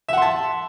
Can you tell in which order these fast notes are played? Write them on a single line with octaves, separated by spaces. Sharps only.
E5 F#5 C6 A5